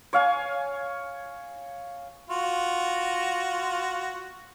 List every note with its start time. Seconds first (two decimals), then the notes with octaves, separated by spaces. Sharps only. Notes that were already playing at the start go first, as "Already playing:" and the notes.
0.13 C#5 F5 G#5
2.30 F4 F#4